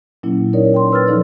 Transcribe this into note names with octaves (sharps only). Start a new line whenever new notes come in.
A#2 F#3 A#3 C#4 E4
D#4 A#4 C#5 D5
G5 C6
B4 E6 F6 A6
F3 D#4 A4 D5